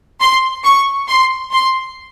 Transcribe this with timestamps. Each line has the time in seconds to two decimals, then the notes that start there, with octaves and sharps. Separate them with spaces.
0.20 C6
0.64 C#6
1.08 C6
1.52 C6